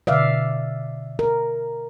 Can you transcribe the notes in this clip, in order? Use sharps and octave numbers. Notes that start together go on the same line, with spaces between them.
B2 D3 D5 E5 F5
A#4